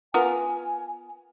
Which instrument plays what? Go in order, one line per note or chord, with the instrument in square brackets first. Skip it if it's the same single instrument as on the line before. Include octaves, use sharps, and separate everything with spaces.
[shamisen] B3 F4 A#4 [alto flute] G#5